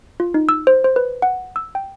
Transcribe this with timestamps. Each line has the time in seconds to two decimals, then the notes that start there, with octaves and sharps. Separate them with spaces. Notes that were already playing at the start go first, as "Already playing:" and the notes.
0.20 F4
0.34 D#4
0.49 E6
0.67 C5
0.84 C5
0.96 B4
1.22 F#5
1.56 E6
1.75 G5